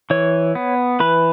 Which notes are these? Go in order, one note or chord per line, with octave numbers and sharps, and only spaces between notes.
E3 C#5
B3
E3 B4